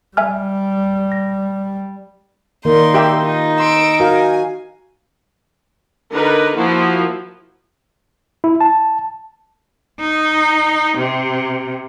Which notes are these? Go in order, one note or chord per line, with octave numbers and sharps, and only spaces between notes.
G3 E5 G#5 F6
A#6
D#3 A#3 D#4 D5 C6
G4 E5 G5
D#4 F4
C6 E6 D7
F#4 A#4 F5 G#5
D3 D#4 A#4 B4
F3 A#3 E4 F#4
E4
A5
D#4
C3